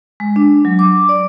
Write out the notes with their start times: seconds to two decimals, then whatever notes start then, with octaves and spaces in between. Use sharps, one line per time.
0.20 G#3
0.36 D4
0.65 F#3
0.79 D6
1.09 D5